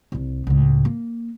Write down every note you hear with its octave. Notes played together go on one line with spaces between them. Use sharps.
C2 C3
C#2 A2
A#3